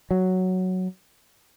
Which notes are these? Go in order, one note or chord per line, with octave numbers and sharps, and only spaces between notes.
F#3